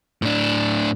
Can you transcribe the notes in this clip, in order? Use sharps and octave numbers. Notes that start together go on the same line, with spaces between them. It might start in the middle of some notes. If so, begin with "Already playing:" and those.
A2 D4